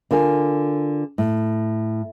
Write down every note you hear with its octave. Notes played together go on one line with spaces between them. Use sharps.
D3 F4 A#4 G#5
A2